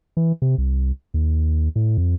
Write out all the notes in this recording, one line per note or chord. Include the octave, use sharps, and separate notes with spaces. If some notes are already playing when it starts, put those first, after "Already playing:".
E3
C3
C2
D#2
A2
F2